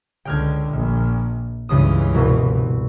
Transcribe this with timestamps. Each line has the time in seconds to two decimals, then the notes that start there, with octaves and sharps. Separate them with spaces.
0.25 C#2 D3 G5 F6 G#6
0.71 A#1
1.69 C#2 G2 C#3 E3 D#6
2.14 C2 B2